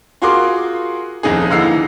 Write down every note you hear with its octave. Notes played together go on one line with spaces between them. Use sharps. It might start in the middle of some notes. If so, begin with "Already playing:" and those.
F4 F#4 G#4 A#4 C6 D6
D#1 F2 D#4 G#4
D#2 D3 E3 D#4 E6 C7